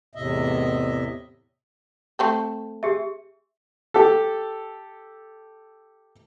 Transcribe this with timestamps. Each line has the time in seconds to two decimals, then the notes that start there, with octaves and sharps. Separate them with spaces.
0.15 E2 A2 C3 D#5 E5
2.19 A3 C4 A4
2.83 G4 G#4 E5
3.94 G4 A4